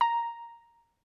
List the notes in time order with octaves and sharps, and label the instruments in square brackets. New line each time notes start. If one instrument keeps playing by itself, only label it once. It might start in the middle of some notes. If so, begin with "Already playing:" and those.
[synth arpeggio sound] A#5